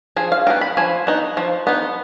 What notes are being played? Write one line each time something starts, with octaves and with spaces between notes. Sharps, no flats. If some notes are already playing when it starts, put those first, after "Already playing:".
F3 G#4
F5
B3 D#4 G5
B5
F3 G#5
B3 D#4
F3
B3 D#4